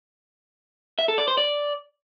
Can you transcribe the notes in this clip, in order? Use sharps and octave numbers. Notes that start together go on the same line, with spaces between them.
E5
A4
D5
C5
D5